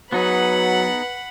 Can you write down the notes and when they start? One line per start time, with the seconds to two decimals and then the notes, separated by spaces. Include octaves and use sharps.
0.13 F#3 B3 D#4 G#4 B4 F#5 B5